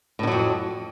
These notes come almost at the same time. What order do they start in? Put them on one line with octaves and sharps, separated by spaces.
A2 D3 F#3 F2